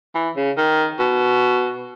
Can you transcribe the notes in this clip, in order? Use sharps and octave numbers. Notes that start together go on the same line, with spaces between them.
E3
C#3
D#3
B2